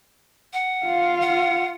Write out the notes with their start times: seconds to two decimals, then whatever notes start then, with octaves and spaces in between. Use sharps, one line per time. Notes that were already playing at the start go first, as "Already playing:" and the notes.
0.53 F#5
0.86 F4 F5
1.21 F#5